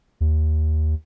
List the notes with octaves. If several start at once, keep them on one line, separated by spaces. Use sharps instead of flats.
D#2